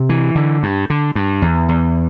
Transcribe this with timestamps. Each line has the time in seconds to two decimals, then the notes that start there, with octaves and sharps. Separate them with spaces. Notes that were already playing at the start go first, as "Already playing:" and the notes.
Already playing: C3
0.09 E3
0.35 D3
0.63 G2
0.90 D3
1.15 G2
1.42 E2
1.69 E2